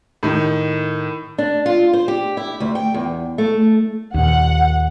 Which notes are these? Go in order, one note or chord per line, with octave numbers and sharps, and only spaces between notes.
A2 D#3
D4
F4
C5
G4
E4
D2
G5
E2
A3
D#2 A#2 F#5